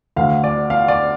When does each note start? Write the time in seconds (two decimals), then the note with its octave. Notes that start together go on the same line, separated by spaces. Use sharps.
0.16 D2 D3 F5
0.44 D5
0.70 F5
0.88 D5